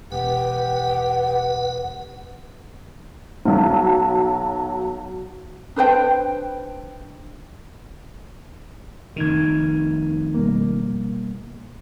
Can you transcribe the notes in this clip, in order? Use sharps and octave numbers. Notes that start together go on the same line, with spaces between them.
E1 G4 B4 F#5
B1 F#3
D4 B4 C5 G5
F1 C2 D#3 D#4 G#6
B2 G3 A#3